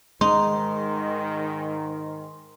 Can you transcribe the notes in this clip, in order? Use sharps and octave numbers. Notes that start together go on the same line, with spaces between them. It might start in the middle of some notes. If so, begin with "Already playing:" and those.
G#2 D#3 G#3 D#4 C6